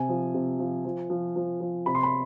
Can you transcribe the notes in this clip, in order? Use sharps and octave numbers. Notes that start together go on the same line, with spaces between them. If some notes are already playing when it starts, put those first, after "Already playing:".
Already playing: C3 G#5
F3
C3
F3
F3
F3
F3
F3
C3 B5
C6
B5